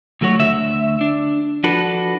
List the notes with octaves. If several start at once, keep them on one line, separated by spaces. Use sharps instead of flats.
D2 F#3 A3 F#4 C#5
D2 E5
D4
F3 D4 F#4 A4 B4